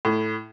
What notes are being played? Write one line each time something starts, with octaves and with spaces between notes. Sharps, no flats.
A2